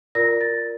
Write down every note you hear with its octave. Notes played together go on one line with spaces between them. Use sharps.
F4 A#4 D5 A#6
A6